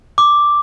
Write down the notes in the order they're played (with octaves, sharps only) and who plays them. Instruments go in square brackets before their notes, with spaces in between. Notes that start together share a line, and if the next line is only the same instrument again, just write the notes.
[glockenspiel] D6